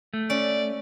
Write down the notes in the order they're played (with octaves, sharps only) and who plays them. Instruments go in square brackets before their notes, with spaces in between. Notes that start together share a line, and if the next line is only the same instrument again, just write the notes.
[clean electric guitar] A3
[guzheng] C#4 [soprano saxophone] D5